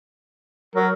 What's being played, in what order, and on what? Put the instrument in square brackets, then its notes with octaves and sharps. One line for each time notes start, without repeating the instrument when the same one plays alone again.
[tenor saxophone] F#3 [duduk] A#4